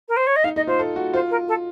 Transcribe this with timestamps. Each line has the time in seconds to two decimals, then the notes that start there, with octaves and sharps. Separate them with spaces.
0.08 A#4
0.16 C5
0.27 C#5
0.36 D#5
0.44 D#4 F5
0.56 D#4 D#5
0.67 F4 C5
0.79 A4
0.96 F#4
1.13 F4 C5
1.30 A#4
1.48 A4